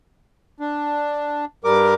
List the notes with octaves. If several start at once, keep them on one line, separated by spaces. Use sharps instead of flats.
D4
G2 G3 A#4 D6